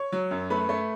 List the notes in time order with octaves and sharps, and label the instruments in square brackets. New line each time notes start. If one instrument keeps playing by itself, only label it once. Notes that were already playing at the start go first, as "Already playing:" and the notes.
Already playing: [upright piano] C#5 C#6
F#3
F#2
A3 B4 B5
A3